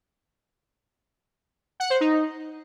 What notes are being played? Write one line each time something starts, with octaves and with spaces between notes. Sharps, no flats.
F#5
C5
D#4